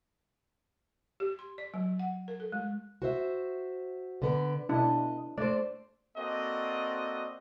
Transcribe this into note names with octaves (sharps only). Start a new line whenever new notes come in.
G4
C6
D5
F#3
F#5
A#4
A4
G#3
F#4 C5 E5
D3 B3 D5
B2 D4 E4 D#5
A3 C5 D5
A#3 C4 F#4 A4 D5 D#5